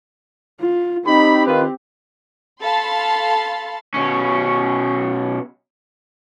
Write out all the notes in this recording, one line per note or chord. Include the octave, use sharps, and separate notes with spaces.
F4
C4 D#4 G4 B5
D#3 F4 B4
A4 F5 A5 B5 C6 A6
B2 C#4